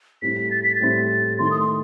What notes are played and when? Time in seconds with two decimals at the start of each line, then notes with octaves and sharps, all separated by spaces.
0.22 A2 G3 C4 E4 B6
0.51 A6
0.63 B6
0.75 A6
0.81 A2 G3 C4 E4
1.39 D#3 A3 C4 E4 C6
1.51 D#6
1.60 C6